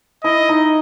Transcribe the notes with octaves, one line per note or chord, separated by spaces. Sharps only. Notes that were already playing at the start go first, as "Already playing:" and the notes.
E4 D#5
D#4